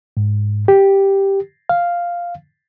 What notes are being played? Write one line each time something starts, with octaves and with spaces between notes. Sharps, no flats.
G#2
G4
F5